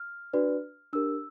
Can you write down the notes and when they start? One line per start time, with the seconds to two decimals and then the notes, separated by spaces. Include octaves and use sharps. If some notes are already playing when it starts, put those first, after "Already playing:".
Already playing: F6
0.33 D4 F#4 B4 D5
0.93 D4 G4 A#4 E6